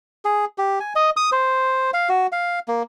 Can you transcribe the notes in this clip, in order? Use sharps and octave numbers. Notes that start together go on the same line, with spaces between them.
G#4
G4
G#5
D#5
D#6
C5
F5
F#4
F5
A#3